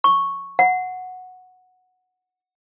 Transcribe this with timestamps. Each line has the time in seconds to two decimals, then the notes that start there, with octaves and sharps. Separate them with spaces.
0.04 C#6
0.59 F#5